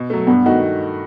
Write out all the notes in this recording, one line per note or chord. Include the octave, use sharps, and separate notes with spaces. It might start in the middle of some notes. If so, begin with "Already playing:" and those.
Already playing: B2
F#3 A3
G2 B3
D#3 A3 D#4 F#4